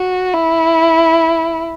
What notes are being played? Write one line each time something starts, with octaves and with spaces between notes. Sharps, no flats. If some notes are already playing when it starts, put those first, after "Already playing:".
Already playing: F#4
E4